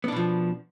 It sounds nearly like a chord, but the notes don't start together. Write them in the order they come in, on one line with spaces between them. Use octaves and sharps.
B3 D4 B2 F3